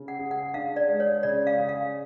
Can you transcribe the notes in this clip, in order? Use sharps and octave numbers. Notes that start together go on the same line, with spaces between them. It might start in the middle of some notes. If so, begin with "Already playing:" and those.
Already playing: C#3
F#5
G#4
F#5
D4 F5
D5
G#3
C#5
C#3 D5
F5
G#4
F5